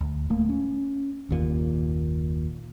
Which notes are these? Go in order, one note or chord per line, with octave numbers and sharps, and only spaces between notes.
D2
D1 A3 A#3
C#4
F#1 D#2 A#2